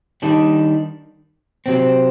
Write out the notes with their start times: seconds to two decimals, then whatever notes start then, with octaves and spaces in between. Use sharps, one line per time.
0.22 D#3 G3 D4
1.66 C3 F#3 C4